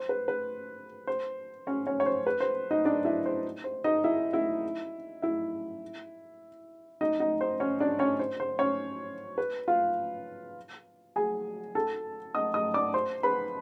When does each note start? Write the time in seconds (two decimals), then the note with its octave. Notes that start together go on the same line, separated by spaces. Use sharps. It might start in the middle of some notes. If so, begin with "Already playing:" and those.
Already playing: C5
0.09 B4
0.28 B4
1.07 C5
1.67 C#4 C#5
1.87 C#4 C#5
2.00 C#5
2.06 C5
2.27 B4
2.40 C5
2.71 D#4 D#5
2.85 D4 D5
3.05 E4 E5
3.26 C5
3.64 C5
3.84 D#4 D#5
4.04 E4 E5
4.33 E4 E5
5.22 E4 E5
7.01 D#4 D#5
7.20 D#4 D#5
7.41 C5
7.60 C#4 C#5
7.80 D4 D5
7.99 C#4 C#5
8.19 C5
8.40 C5
8.59 C#4 C#5
9.38 B4
9.68 F4 F5
11.16 G#4 G#5
11.75 A4 A5
12.35 D#5 D#6
12.54 D#5 D#6
12.74 D5 D6
12.94 C5 C6
13.23 B4 B5